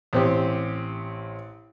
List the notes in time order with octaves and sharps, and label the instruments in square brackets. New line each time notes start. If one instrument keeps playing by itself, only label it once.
[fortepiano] A1 C4 G4